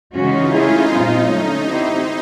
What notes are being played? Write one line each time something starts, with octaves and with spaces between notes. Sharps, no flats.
C#3 E3 G#3 C#4 D#4 F4 F#4
A3 C#4 E4 G#4
A#2 G3 C4 D#4 F4
D3 F#3 A3 C#4
C4 E4 G4 C5